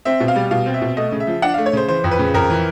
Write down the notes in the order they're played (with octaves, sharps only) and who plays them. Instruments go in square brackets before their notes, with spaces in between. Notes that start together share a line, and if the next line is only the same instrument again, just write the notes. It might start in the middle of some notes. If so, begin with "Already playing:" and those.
[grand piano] C4 E5
B2
F5
G3
B2 F5
C4
E5
B2
A3 D#5
C#3
E5
F3
D4 F#5
F5
A3
C#5
C#3 C5
E3 C5
F2
B4
C#3
F2 A#4
E3